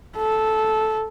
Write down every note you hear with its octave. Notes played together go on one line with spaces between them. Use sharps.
A4